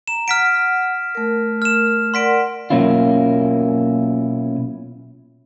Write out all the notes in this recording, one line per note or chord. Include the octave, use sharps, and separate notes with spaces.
A#5 E7
F#5 F6 B6 D7
A3 A#4
F6 E7
A#4 D5 F#5 C6 B6 D7
B2 F#3 A#3 C#4 E4 F4